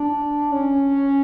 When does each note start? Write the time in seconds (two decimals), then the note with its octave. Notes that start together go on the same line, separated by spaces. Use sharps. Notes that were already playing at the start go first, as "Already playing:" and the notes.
Already playing: D4
0.52 C#4